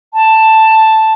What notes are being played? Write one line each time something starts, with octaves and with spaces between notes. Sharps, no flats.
A5